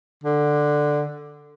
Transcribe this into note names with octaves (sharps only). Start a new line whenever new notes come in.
D3